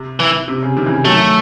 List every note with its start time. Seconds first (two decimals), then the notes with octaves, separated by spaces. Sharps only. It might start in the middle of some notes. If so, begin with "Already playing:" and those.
Already playing: C3
0.20 E3
0.48 C3
0.63 C#3
0.76 C3 D#3
0.86 C#3 E3
1.05 D#3 F#3 A3